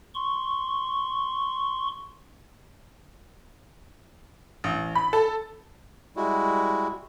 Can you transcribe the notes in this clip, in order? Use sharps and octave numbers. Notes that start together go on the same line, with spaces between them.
C6 C#6
A1
B5
A4
G3 G#3 E4 F#4